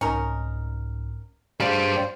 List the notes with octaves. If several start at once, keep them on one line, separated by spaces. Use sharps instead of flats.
C2 G#2 C#4 D#4 A#4
G3 A3 D4 F#4 G#4 C5 F5